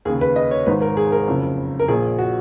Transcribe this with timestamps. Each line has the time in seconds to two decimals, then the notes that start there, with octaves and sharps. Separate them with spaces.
0.05 D#2 G#4
0.08 C#3
0.21 B4
0.36 D#5
0.51 C#5
0.66 G#1 G#2 D#3 B4
0.81 A#4
0.97 G#4
1.12 A#4
1.27 F#1 F2 C#3
1.80 A#4
1.88 A#1 A#2 G#4
2.19 F#4